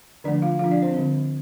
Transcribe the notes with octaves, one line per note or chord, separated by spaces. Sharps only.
D3 F3 A3 D4 D5
F4 F5
F3 D4 F4 F5
D4 D5
C4 C5
D3 G3 C4